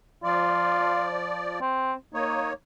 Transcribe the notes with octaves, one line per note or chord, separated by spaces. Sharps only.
F3 F4 D5
C4
A#3 D#4 C#5